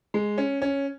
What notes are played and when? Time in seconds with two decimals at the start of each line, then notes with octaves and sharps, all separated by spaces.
0.14 G#3
0.38 C#4
0.62 C#4